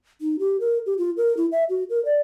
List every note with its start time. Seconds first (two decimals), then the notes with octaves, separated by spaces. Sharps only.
0.21 D#4
0.39 G4
0.60 A#4
0.86 G4
0.98 F4
1.17 A#4
1.37 E4
1.52 E5
1.69 F#4
1.90 A#4
2.05 D5